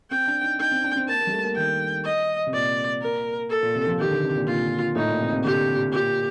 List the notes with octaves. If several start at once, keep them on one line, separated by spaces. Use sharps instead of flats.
C4 G5
D4
D#4
D#4 G5
C4
D4
C4
A#3 A5
A#3
G3
A3
A#3
D#3 G5
D#5
C3
A#2 D5
A#4
A4
A#2
C3
F3
D#3 G4
D3
C3
A#2
A#2 F4
A2 D#4
A#2
C3
C3
D3 G4
A#2
A#2 G4